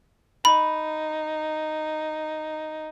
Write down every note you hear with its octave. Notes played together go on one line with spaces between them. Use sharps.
D#4 B5